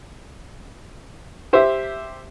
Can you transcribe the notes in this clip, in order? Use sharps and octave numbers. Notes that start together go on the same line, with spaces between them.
G4 C5 E5